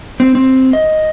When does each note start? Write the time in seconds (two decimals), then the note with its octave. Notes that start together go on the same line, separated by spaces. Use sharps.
0.20 C4
0.35 C4
0.73 D#5